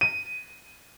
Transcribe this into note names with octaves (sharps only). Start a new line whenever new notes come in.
D#7